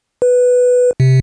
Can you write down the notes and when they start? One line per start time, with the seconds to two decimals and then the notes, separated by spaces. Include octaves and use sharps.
0.22 B4
1.00 C3